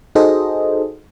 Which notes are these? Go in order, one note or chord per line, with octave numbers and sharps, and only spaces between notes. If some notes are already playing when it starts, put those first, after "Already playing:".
D#4 F#4 G#4 A4 C5 D#5